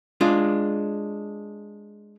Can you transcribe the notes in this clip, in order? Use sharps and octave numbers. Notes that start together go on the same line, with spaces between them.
G#3 D4 F4